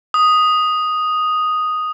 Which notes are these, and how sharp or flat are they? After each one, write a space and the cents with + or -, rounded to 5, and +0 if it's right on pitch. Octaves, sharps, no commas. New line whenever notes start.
D#6 +0